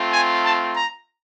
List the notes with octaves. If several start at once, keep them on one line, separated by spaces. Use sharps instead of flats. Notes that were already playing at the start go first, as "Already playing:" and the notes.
Already playing: A3 C4 F4
G#5
A5
A#5